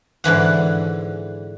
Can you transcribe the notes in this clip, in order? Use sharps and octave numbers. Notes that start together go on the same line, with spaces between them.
G#2 D3 E3 F#5